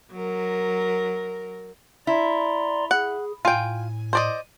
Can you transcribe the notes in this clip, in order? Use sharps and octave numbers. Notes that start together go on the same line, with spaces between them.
F#3 A#4
E4 D5 A#5 C6
G#4 F#5
A2 F4 G5 G#5
C5 D5 D#5